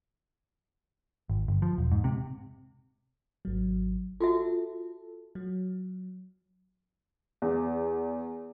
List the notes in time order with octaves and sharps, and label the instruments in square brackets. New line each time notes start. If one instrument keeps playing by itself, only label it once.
[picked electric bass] G#1
G1
F3
E1
G#2
C3
[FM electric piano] G#1 F#3
[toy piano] F4 F#4 E5 [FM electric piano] A4
[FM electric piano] F#3
[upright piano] E2